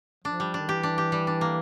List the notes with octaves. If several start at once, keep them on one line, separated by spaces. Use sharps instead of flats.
F3 D4
G3
D4
D#3
E3 G4
D4
G4
G3
D4
A#3